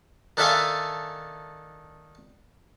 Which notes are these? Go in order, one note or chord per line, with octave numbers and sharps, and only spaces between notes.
D#3 D4 A4 E5 F5 G#5